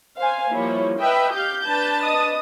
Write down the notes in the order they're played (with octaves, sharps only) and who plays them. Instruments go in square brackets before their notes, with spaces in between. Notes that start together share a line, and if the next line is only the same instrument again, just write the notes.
[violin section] C5 F5 G#5
[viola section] F3 G3 A#3 [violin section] E4 C#5
[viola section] B4 D#5 E5 [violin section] G5
[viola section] G4 F5 [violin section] G6
[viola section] D4 B4 A5
[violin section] D#5 D#6